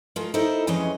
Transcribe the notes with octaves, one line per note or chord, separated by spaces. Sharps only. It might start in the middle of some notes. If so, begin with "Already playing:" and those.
G#3 A3 F4 A#4
D#4 E4 A4 A#4 C5 D#5
F2 E3 G#3 C#4 C#5 D#5